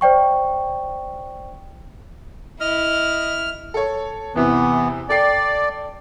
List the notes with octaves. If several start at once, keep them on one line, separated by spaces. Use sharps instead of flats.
C5 D5 G5 C#6
E4 D#5 F6
A4 C#5
E2 C3 E3 B3
A4 D5 G5 C7